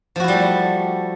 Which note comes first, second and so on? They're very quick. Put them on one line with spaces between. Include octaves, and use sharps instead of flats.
F3 F#4 E4 G3 A3